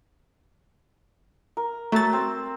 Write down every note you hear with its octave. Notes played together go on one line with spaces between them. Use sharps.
A#4
F#3 A3 A6
C4